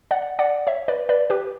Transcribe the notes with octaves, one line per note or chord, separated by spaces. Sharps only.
D5 F#5
D5 F#5
C#5 E5
B4 D5
B4 D5
G4 B4